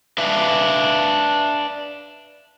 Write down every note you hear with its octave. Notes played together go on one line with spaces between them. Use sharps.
D4 B4 E5 F5